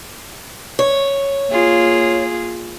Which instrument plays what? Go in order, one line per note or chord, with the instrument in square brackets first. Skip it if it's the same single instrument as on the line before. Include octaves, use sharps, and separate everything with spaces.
[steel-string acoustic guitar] C#5
[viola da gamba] A#3 F4 G#4